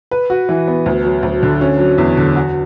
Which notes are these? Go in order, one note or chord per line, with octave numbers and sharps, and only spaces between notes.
B4
F#4
E3
B3
D2
F#3
D2
D3
C#4
F#3
E2
D3
F#4